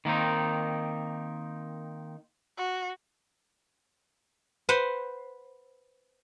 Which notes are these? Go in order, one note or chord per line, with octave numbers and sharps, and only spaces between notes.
D#3 A#3 C4 D#4
F#4
B4 C5 F#5